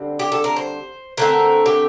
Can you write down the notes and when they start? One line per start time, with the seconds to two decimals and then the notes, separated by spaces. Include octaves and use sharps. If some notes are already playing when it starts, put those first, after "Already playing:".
Already playing: D3 G3 C4
0.19 G4
0.32 A4
0.44 A#4
0.56 C5
1.17 D3 A3 C4 A#4
1.66 G4